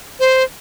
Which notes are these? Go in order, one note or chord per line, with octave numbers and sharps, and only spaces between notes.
C5